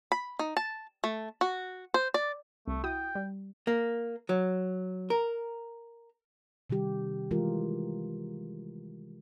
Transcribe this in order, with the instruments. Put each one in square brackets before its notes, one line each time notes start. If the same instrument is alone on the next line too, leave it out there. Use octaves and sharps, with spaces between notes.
[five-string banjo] B5
D#4
A5
A3
F#4
C5
D5
[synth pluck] C2 [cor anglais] A3
[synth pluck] E4 F#4 D#6 [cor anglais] G5
[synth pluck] G3
[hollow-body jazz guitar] A#3
F#3
A#4
[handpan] C3 D#3 G3 G4
E3 G#3 A3 F4 G4 A#4